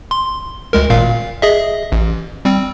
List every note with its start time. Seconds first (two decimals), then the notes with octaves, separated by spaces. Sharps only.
0.11 C6
0.73 D2 G#3 A#4
0.90 G#1 A#2 F5
1.42 G#4 D#5 E5
1.92 A1
2.45 G3 C4